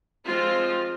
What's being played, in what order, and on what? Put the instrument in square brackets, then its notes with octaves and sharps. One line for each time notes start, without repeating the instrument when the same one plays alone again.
[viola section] F3 G#3 C4 F4